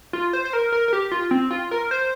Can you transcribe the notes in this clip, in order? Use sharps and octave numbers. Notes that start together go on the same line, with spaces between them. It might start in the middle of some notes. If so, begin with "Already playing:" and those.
F4
C5
C5
A#4
A#4
A#4
G4
F4
C4
F4
A#4
C5